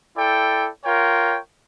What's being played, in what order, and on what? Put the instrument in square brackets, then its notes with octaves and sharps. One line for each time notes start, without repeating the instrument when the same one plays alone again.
[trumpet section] E4 A4 D5 G5
F4 A#4 C#5 G5